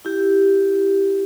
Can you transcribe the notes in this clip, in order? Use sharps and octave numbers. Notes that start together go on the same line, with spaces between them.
E4 G4